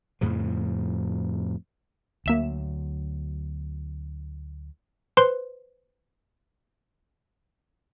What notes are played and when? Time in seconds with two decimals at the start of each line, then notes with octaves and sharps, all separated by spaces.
0.21 F2 A2 C#3 F3
2.26 D2 F#3 A#3 E5 E7
5.17 B4 C5 C6